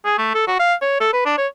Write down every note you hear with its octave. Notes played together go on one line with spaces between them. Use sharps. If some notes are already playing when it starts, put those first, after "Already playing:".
G#4
A3
A4
F#4
F5
C#5
A4
B4
D4
C#5